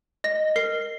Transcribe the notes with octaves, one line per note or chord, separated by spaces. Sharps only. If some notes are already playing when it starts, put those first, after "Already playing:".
D#5 A#6
A#4 C7